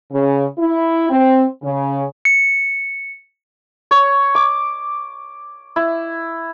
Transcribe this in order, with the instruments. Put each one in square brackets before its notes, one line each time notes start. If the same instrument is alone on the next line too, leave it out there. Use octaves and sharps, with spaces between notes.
[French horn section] C#3
E4
C4
C#3
[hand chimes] C#7
[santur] C#5
D6
E4